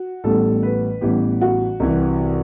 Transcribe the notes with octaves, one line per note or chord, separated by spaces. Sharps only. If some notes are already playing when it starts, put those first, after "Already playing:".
Already playing: F#4
A1 A2 E3 G3 B3 A4
B4
A1 A2 E3 G3 B3 G4
F#4
C2 C3 E3